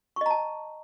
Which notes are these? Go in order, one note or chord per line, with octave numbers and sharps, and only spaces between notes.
D#5 A5 A#5 C#6